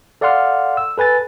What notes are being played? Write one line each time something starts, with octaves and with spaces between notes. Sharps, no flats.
A4 D5 F5 F#5 C6 F6
E6
A4 B4 G#5 A6